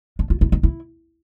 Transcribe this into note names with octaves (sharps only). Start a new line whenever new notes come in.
D4
F4
E4
D#4
E4